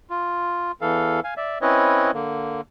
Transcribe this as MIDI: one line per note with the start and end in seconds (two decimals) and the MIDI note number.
0.10 0.72 65
0.81 1.20 40
0.81 1.20 52
0.81 1.20 69
0.81 1.20 77
1.24 1.34 77
1.24 1.34 80
1.37 1.58 74
1.37 1.58 76
1.62 2.11 60
1.62 2.11 61
1.62 2.11 64
1.62 2.11 71
1.62 2.11 73
1.62 2.11 75
2.14 2.61 50
2.14 2.61 58